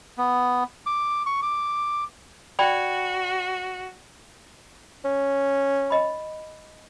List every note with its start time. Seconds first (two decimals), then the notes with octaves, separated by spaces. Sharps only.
0.18 B3
0.86 D6
1.26 C#6
1.43 D6
2.59 F#4 D5 G5 B5
5.05 C#4
5.90 D#5 B5